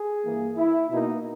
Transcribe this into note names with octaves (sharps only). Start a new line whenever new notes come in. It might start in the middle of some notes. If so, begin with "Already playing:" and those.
Already playing: G#4
G2 E3 A#3
E4
B2 A#3 D#4